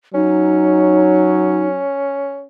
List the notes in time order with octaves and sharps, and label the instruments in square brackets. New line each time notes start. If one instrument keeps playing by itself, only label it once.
[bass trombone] F#3 [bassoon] C#4 [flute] D#4